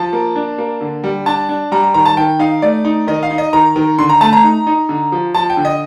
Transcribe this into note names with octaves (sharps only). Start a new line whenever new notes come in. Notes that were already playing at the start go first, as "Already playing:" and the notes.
Already playing: F3 A5
A#3
D4
A#3
D3
G3
D4 A5
D4
G3 A#5
A#5
D#3 A#5
A5
D#3 G5
D#4 F5
A3 D5
D#4
D#3 D#5
F5
D#4
D#5
D#3 A#5
D#3
D3 C6
A#5
A3 A5
A#5
D#4
D#4
D3
F3
F3 A5
G5
D3
D#5